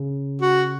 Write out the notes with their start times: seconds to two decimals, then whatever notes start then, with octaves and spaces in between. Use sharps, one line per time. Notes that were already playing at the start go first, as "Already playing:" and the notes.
Already playing: C#3
0.42 F#4